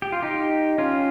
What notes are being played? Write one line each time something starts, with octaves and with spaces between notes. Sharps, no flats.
G4
F4
D#4 G4
C#4 F4